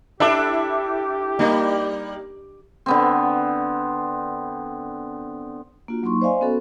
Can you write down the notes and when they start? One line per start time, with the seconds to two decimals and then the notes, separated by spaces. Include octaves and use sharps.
0.20 D4 E4 G4 A4 E5 D6
1.39 G3 A#3 D#4
2.86 D3 B3 C4
5.88 A#3 D4 F4 F#4
6.03 F#3 A#3 D#4 C6 C#6
6.22 C5 D5 D#5 F5 G#5 C6
6.41 B3 C#4 F#4 A4